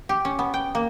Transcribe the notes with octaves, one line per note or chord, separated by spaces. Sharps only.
G4
C#4
B3
G5
A#3